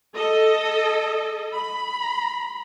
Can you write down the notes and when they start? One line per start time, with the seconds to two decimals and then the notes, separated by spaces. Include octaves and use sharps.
0.15 A4 D#5
1.54 B5